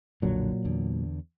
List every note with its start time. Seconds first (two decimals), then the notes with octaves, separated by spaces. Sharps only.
0.22 B1 F2 A#2 D3 F#3
0.65 E2 D3